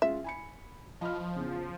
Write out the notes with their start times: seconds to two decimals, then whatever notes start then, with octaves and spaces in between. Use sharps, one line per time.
0.02 G#3 C#4 F4 E5
0.24 G#5 B5 C#7
1.01 F3 D#5 B5 F6
1.36 E2 C#3